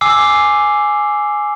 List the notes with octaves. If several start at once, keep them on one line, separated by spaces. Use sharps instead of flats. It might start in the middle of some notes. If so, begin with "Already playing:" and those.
G#5 D6 E6 C7